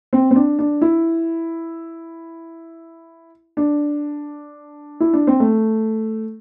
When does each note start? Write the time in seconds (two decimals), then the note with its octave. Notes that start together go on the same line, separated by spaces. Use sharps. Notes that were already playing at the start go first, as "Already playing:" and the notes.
0.13 C4
0.31 C4
0.36 D4
0.59 D4
0.82 E4
3.57 D4
5.00 E4
5.13 D4
5.27 C4
5.40 A3